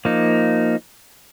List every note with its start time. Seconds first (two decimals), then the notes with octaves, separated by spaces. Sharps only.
0.05 F3 A#3 D#4